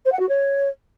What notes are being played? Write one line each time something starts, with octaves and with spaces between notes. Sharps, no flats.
C5
F#5
F#4
C#5